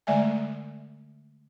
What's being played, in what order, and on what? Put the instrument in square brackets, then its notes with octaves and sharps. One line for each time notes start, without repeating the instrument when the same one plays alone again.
[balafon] D3 G#3 A3 D5 E5 G#5